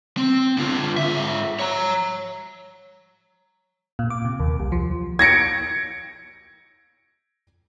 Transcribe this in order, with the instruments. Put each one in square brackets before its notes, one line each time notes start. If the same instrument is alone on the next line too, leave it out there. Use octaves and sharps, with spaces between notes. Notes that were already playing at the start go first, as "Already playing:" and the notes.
[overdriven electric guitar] C4
D3 F4
G#2 E5
C#5 A#5
[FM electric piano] A#2
D6
C3
D#2
C2
F3
[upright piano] G#6 A#6 C#7 D7